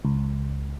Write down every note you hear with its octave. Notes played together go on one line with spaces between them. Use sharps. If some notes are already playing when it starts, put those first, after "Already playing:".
C#2